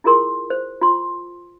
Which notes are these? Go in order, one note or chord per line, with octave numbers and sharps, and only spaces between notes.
E4 F4 G#4 A#4 C6
C5
F4 C6